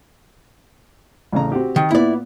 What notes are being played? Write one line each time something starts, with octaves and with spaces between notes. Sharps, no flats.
A1 C#3 A#5
C4 F#4 G4
D#3
A#2 B3 E4 D5